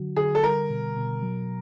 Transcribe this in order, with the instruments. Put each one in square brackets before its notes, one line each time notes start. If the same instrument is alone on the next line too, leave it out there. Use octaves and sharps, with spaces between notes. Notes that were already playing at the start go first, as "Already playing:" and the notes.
Already playing: [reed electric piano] D3 F#3 F#4
[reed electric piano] D3 [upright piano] G#4
[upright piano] A4
[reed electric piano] G3 [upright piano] A#4
[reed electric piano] B2
B2
F#3